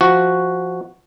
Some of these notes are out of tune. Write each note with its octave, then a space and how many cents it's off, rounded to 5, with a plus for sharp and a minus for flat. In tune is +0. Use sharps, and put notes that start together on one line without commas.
F3 +0 F#4 +0